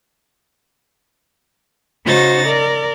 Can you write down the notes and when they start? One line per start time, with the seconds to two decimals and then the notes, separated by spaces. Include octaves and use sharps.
2.05 C#3 D#4 F#4 C5 A6 A#6
2.46 A#4 D5